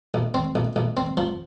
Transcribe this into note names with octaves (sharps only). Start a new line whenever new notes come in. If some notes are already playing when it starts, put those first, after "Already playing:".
A#1
C4
A#1
A#1
C4
F3